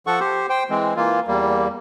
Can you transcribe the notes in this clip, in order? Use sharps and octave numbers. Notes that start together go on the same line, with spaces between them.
F3 A4 F#5 C#6
G4 C5
C5 G5
E3 G#3 C4
E3 A#3 F4
E2 G3 A#3